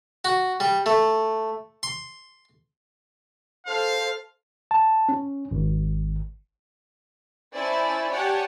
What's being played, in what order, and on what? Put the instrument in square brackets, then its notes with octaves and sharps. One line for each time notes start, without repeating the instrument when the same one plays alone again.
[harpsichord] F#4
G3
A3
C6
[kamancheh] A4 C5 [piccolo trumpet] F5
[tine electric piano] A5
C#4
G#1
[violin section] C#4 E4 C5 D5 G#5 A5
G4 C#5 D5 F#5 G#5 A5